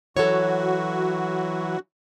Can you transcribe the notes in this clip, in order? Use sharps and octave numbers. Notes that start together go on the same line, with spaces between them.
E3 F#3 F#4 A4 C#5